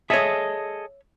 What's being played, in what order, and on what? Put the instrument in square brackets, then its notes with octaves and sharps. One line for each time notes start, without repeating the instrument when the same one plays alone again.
[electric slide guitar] G#4 A4 D#5 [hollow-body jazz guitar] C#5 E5